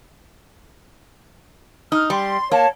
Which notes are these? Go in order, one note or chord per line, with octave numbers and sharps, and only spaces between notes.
D#4 F6
G3 C6
A#3 C#5 A5